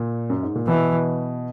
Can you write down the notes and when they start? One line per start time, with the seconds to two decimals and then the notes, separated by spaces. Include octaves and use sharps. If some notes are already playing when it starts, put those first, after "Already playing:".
Already playing: A#2
0.30 F#2
0.43 G#2
0.56 A#2
0.67 B2 E3